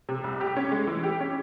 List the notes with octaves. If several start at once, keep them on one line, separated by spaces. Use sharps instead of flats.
C3
C2
G4
C#4
G#3
E3
G4
C#4